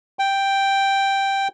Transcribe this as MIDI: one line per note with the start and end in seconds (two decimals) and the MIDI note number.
0.19 1.48 79